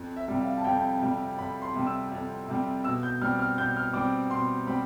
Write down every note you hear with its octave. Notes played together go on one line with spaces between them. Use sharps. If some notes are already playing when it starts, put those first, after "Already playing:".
Already playing: F2
E5
C3 G3
F5
A5
F2 G5
C3 G3
F2 B5
C6
C3 G3
E6
F2
C3 G3
B2 E6
G6
G3 C4 F6
F6
B2 G6
F6
G3 C4 D6
B2 C6
G3 C4 B5